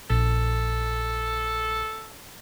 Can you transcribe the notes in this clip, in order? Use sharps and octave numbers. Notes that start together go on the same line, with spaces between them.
A#1 A4